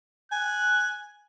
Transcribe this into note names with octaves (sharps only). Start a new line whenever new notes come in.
G#5 F#6